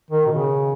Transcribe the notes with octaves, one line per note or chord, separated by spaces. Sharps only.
D#3
B2
C#3